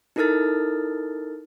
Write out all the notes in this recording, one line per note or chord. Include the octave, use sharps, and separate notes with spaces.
D#4 E4 A4 A#4 F6 A6